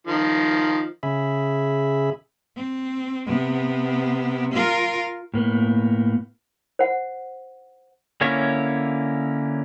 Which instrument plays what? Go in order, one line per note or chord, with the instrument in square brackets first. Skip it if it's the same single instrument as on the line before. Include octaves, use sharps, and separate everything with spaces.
[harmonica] D#3 F3
[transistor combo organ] C#3 G#4 E5 B5
[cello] C4
C3 B3
F4 A#4
[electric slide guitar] A2 A#3 B3
[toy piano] C5 F#5
[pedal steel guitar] D3 A#3 C#4 E4 C#5